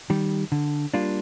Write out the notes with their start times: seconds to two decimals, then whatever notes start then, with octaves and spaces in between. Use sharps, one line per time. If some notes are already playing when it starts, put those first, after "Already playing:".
0.10 D#3 G3
0.52 D3
0.94 G3 A#3 D4 F4